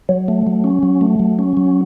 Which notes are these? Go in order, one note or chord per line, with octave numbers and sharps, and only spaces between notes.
F#3
A3
F#3
C#4
F#3
A3
F#3
C#4
F#3